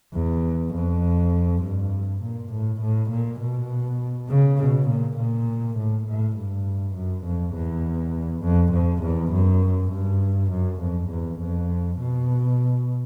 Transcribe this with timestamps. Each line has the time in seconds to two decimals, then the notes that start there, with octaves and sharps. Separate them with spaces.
0.15 E2
0.74 F2
1.63 G2
2.22 A#2
2.53 A2
2.81 A2
3.11 A#2
3.41 B2
4.29 C#3
4.59 B2
4.89 A#2
5.18 A#2
5.78 A2
6.07 A2
6.37 G2
6.95 F#2
7.25 F2
7.54 E2
8.43 F2
8.73 F2
9.03 E2
9.32 F#2
9.92 G2
10.51 F#2
10.80 F2
11.10 E2
11.40 F2
11.98 B2